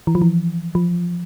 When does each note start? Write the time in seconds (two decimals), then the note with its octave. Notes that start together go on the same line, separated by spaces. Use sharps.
0.07 E3
0.15 F3
0.22 E3
0.75 F3